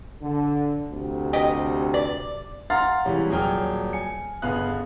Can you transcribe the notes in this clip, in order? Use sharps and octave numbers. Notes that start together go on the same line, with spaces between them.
D3
D2 C3
G4 D#5
D5
F5 F#5 A#5 C6 F6 A6
C3 E3 G3 G#3 C#4
D#1 F#3 G#4 G5 F6
G#5 C#7
G1 C#3 B3 G#4 F5 F#6